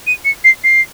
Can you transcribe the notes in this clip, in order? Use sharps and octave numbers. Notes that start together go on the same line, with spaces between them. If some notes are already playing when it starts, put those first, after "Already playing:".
D#7
C#7
C7
C7